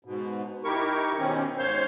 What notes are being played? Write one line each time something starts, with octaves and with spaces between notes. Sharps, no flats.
G#2 B2
D#4 E4 G4 A#4 C#6
B2 D#3 C4 C#4
G#2 C5 C#5 F5 G6